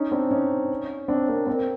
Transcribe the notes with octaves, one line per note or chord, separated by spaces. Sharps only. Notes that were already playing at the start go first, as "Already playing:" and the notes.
Already playing: C#4 D#4
C4 D4
C#4 D#4
C4 D4
A#3 C4
A#3 C4